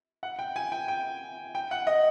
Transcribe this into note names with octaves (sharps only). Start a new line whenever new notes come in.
F#5
G5
G#5
G5
G5
G5
F#5
D#5